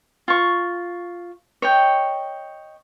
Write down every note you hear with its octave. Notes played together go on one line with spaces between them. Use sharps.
F4 C#6
C#5 D#5 G5